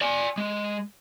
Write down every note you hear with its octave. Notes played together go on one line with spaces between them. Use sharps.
D5 G#5
G#3